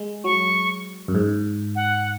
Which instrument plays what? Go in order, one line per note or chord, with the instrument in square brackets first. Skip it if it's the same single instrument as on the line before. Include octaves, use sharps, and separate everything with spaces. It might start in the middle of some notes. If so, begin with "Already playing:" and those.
Already playing: [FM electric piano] G#3
[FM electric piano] F#3 [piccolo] C#6
[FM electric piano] F#2
G#2
[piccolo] F#5